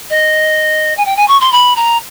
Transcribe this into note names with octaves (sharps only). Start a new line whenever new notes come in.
D#5
G#5
G5
G#5
C#6
C6
B5
A#5